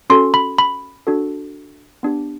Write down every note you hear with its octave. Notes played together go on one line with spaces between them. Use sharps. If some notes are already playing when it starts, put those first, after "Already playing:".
C#4 F#4 A4 C6
B5
B5
D4 F#4 A4
B3 D4 G4